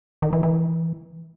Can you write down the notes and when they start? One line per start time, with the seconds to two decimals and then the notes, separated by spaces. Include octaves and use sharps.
0.22 D#3
0.33 E3
0.43 E3